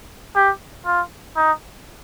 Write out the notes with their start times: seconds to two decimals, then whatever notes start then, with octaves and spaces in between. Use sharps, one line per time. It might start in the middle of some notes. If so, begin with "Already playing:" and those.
0.36 G4
0.86 F4
1.37 D#4